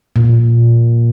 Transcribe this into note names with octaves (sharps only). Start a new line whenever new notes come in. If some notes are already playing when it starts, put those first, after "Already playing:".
A#2